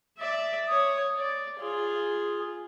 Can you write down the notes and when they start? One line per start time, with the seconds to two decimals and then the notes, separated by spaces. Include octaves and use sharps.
0.18 D5 E5
0.68 C#5 D#6
1.18 D5
1.60 F4 G#4